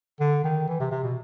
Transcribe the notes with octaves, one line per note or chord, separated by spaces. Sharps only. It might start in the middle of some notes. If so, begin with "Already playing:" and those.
D3
D#3
E3
C3
C3
B2